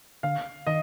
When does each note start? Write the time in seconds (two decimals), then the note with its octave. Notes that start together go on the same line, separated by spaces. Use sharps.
0.23 D3 F5
0.67 D#3 D#5